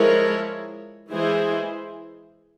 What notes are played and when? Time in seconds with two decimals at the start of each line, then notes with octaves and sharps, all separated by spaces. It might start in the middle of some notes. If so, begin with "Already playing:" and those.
Already playing: F3 G#3 E4 A#4 C#5
1.11 E3 G#3 E4 G#4 C5